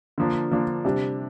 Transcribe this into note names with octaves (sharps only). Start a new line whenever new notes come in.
D3 F3 A#3 D4
D3 F3 A#3 D4
C3 G3 D4